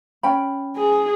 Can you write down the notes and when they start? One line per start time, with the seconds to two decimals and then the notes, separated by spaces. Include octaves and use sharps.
0.23 C#4 G5 B5
0.77 G#4